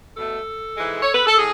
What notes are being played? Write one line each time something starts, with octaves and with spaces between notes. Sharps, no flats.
B2 A3 A4
G#2 E3 G#3
C#5
B4
A4
A2 G#4